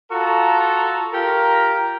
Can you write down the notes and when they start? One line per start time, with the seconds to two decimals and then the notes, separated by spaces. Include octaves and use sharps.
0.11 F4 F#4 A4 A#5
1.14 F4 G4 A#4